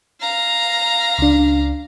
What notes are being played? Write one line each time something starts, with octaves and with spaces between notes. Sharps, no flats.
F5 A#5
C#2 D4